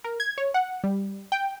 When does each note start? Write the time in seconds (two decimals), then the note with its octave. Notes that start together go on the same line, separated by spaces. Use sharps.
0.04 A#4
0.20 G#6
0.38 C#5
0.54 F#5
0.84 G3
1.32 G5